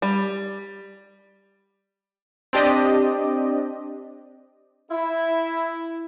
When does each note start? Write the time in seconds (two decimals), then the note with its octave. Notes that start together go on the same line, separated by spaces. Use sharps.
0.02 G3
2.53 C4 D4 G4 D5 D#5
4.91 E4